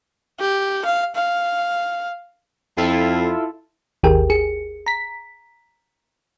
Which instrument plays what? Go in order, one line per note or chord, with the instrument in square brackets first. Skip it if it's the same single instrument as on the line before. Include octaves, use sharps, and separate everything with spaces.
[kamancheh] G4
F5
F5
[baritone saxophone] F2 [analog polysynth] E4 F4 A4
[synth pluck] G#1 D#2 G4 G#4 A#4 G5
G#4 C#7
A#5 B6